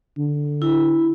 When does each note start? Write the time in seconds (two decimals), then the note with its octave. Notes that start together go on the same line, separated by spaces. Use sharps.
0.18 D3
0.62 E4